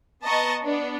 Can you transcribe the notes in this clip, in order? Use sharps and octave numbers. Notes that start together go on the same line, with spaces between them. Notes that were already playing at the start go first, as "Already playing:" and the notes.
B3 D#5 A5 A#5 C#6
B3 D4